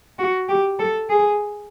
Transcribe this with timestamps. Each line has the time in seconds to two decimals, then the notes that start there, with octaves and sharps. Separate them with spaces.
0.19 F#4
0.49 G4
0.79 A4
1.10 G#4